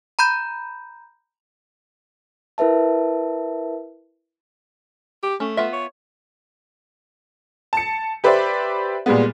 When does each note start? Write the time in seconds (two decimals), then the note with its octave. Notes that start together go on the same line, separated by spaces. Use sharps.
0.19 A#5 B5 G6
2.58 E4 A#4 B4 E5 A5
5.23 G4
5.40 A3 C#4
5.57 B3 F4 E5
5.73 C#5
7.73 A5 C#7
8.24 G4 B4 C5 D5 E5
9.06 A#2 G3 G#3 B3